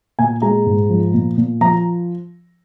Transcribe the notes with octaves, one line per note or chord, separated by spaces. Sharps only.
A#2 G#5
G#3 A#5
G#2
F3
A#2
A#2
F3 A#5